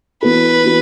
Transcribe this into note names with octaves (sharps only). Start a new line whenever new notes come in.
E3 B3 F#4 A4 B4
E3 B3 F#4